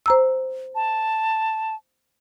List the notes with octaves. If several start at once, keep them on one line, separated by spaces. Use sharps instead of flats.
C5 A#5 E6
A5